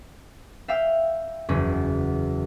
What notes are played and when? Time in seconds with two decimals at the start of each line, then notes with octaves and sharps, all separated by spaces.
0.68 E5 F5 G5 E6
1.49 F#1 E2 C#4